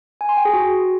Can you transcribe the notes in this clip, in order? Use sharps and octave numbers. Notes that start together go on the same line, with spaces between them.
G#5
C6
G5
G#4
F#4